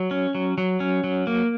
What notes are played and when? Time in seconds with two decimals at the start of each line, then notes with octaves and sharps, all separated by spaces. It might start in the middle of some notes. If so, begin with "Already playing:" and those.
Already playing: F#3
0.11 C#4
0.35 F#3
0.58 F#3
0.80 C#4
1.04 F#3
1.27 A#3